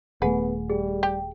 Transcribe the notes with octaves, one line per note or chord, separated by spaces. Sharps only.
D#1 A3 B3 G#4 B4 F#5 G#5
G3 G#4
G4